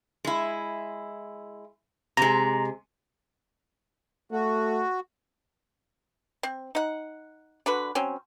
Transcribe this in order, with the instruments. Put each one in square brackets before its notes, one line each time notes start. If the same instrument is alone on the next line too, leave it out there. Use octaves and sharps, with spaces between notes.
[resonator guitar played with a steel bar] G#3 E4
[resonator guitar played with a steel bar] C3 G#3 [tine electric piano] A#5
[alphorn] A3 [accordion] F#4
[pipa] C4
D#4 F#5
D3 F#4 B4
F#3 C4 C#4